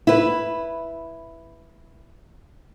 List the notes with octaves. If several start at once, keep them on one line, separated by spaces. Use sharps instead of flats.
E4 B4